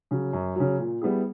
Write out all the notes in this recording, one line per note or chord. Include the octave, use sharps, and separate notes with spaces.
C#3 F#3
F#2
C#3 F#3
A#2
G3 B3 E4 G#4